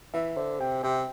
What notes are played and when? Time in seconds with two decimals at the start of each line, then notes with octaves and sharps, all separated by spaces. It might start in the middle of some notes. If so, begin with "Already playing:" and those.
0.14 E3 E5
0.36 D3 C5
0.60 C3 G5
0.83 C3 G5